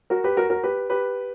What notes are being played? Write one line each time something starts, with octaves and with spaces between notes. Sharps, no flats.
F#4 A#4
G4 B4
F#4 A#4
F#4 A#4
G4 B4
G4 B4